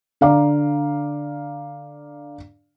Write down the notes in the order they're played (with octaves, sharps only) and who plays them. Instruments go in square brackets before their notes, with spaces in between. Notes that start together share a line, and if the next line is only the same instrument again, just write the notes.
[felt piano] D3 D5 F5 A#5 D6